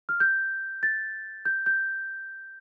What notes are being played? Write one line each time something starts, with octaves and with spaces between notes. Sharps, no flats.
F6
G6
A6
G6
G6